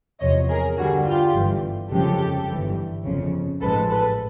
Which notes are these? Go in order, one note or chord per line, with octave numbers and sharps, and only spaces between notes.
E2 C3 F3 C#5 D#5
G#4 A#4
G2 D3 G3 F#4 G#4
F4 G4
G1 G2 E3
G1 F2 C#3 F3 G#3 G4 A4
G1 G2 E3
G1 F2 C#3
A1 G#2 F3 G#3 A4 B4
A4 B4